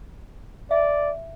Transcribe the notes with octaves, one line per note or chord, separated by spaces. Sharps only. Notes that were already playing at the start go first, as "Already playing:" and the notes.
D5 E5